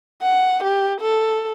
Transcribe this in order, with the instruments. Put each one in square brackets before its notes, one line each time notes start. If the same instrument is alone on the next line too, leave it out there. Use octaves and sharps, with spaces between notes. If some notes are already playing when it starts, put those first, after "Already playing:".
[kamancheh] F#5
G4
A4